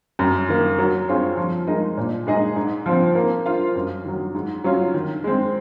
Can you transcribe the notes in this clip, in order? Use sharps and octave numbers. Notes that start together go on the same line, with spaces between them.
F#2
D#3 A#3
F#3
C4 F4 G#4 C#5
F3
G#3 D#4 A#4 D#5
A#2
G#3 D#4 G#4 D#5
G#2
F3 C4
A#3
F4 C5 F5
F#2
D#3 F#3
G#2
F#3 C#4 F4
D#3
G#3 C4